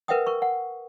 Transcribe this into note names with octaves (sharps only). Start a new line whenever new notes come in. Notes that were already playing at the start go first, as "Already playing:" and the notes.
A#4 B4 E5 F#5 G5 D#6
A#4 C#6
F#5